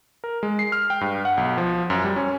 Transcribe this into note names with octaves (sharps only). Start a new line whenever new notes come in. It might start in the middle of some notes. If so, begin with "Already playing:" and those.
A#4
G#3
C7
F6
G5
G2
F#5
B1
F3
F#2
G3
C#4